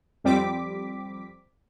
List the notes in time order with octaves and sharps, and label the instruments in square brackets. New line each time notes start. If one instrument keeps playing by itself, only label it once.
[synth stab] F2 G3 C4 D6 B6